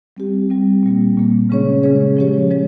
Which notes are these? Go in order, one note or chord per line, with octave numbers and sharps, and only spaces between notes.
G3 C4 G4
G3 C4 G4
A#2 G3 A#3
A#2 G3 A#3
C#3 G#3 C#4 G#4 C#5
C#3 G#3 C#4 G#4 C#5
F3 G#3 C#4 G4 C#5
F3 G#3 C#4 G4 C#5